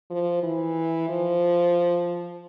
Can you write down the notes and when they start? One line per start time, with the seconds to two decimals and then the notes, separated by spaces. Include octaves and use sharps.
0.10 F3
0.43 E3
1.09 F3